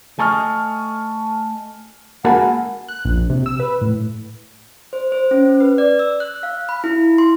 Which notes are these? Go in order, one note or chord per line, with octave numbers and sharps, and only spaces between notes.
A3 A4 D#5 G#5 C#6 F6
G#3 A#3 F#4 A4 A#4 F#5 G#5 B5
F#6
A#1
C3
E6
B4
A2
C5
C5
C#4
B4
D5
E6
F#6
F5
B5
E4
C6